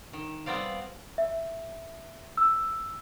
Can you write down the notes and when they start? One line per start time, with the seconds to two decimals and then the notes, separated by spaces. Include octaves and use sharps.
0.13 D#3
0.46 G3 B3 C4 D5 F5
1.18 E5
2.37 E6